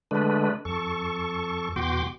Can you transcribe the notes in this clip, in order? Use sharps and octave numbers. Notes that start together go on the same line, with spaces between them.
D3 G#3 A3 D4 B4
F2 A4 C#6
E2 B2 F#4 G5 C6 D6